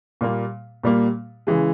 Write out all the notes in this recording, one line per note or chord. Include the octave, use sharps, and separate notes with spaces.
A#2 G3 A#3
A#2 G3 A#3
C#3 E3 G#3